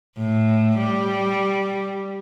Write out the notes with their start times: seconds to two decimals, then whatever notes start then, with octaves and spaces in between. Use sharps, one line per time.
0.17 A2
0.79 G3